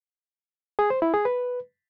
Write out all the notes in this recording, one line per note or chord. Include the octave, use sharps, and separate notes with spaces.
G#4
C5
E4
G#4
B4